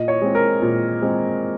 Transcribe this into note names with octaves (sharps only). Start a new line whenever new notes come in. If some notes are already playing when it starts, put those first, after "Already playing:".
Already playing: A#2 D#5
C#5
G#3 C4
A#4
A#2
G#3 C4